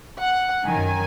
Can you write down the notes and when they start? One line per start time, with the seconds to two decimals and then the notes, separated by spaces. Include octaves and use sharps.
0.21 F#5
0.67 F#2 D#3 G#5